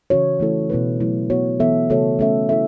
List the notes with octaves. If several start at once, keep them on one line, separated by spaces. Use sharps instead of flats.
C#3 E3 C#4 F#4 C#5
E3 A3 E4 A4
B2 B3 E4 B4
F#3 A3 E4
B3 F#4 C#5
E3 B3 A4 E5
C#3 A3 F#4 A4 C#5
A3 C#4 A4 E5
E4 A4 E5